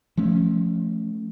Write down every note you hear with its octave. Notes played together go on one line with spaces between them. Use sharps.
F3 A3 C#4